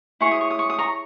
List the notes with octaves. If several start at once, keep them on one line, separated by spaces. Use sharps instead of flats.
E4 G#4 C#5 C#6
D#6
C#6
D#6
C#6
D#6
A#5 C#6